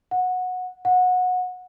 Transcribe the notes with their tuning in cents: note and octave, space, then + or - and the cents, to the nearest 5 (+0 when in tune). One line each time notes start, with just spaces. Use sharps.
F#5 -15
F#5 -20